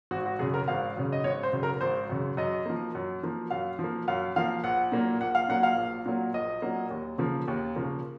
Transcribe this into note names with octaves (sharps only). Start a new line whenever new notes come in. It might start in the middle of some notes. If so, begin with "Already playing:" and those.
G#1 F#4
F#4
F#2 C#3 G#4
A#4
G#1 F5
F#2 C#3
D#5
G#1 C#5
C5
F#2 C#3
A#4
G#1 C5
F#2 C#3
F#2 D#5
F3 A#3
F#2
F3 A#3
F#2 F5
F3
A#3
F#2 F5
F3 A#3 F5
A#1 F#5
A#2 F#3 A#3
A#1 F#5
F5
A#2 F#3 A#3 F#5
F5
A#1
A#2 F#3 A#3
A#1 D#5
A#2 F#3 A#3
D#2
C#3 F3 A#3
D#2
C#3 F3 A#3